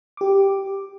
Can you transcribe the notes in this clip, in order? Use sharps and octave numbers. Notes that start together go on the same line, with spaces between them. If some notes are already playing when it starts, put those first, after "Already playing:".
G4 D6